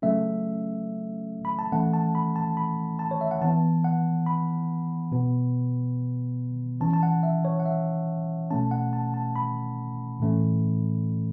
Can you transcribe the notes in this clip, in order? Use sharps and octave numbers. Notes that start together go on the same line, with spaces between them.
C#3 F#3 A3 C#4 E5
B5
A5
E3 A3 C#4 F#5
A5
B5
A5
B5
A5
C#5
E5
F#5
E3 B3 A5
F#5
B5
B2 B3
E3 C#4 A5
A5
F#5
E5
C#5
F#5
E5
B2 A3 C#4 A5
F#5
A5
A5
B5
A2 E3 A3 C#4